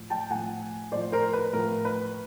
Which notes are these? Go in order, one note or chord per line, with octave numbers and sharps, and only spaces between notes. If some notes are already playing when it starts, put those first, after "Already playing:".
Already playing: A2 F3
G5 A5
A2 F3 F#5 G#5
A2 F3 C5 D5
A#4 C5
B4
A2 F3 A#4
B4